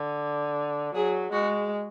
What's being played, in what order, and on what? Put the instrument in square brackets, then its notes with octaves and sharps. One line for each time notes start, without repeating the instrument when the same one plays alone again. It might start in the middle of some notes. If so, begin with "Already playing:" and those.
Already playing: [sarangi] D3
[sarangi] F#3 [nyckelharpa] G#4
[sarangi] G#3 [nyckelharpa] F#4